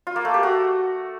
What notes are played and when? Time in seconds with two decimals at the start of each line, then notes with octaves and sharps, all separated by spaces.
0.07 F4
0.16 A#3
0.25 A3
0.34 G4
0.43 F#4